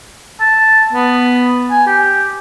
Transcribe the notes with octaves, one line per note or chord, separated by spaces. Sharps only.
A5
B3
G#5
G4